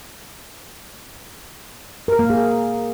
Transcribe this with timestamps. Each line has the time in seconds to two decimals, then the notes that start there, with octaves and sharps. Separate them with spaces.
2.08 A#4
2.19 A#3
2.30 G#4